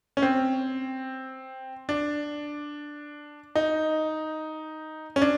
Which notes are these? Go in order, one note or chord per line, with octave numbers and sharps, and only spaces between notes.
C#4
C4
D4
D#4
C#4
D4